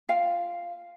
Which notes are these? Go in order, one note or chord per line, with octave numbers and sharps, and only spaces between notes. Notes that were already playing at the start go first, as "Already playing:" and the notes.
F4 F5 G5